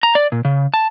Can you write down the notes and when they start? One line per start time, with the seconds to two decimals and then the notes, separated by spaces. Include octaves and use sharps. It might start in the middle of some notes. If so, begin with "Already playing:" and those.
0.03 A#5
0.15 D5
0.32 A#2
0.45 C#3
0.74 A5